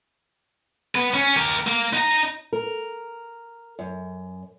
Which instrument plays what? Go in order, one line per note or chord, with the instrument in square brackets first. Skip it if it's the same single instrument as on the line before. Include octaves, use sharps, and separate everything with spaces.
[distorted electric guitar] B3 B4
C#4
G4 A#4
A#3
D#4 A#5
[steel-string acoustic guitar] A#4
F#2